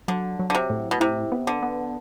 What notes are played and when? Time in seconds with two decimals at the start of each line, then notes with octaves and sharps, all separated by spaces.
0.08 D3 F#3
0.39 F#3
0.50 D3
0.55 C3
0.70 A2
0.91 B2
1.00 C3 E4
1.32 B3
1.47 D3
1.63 B3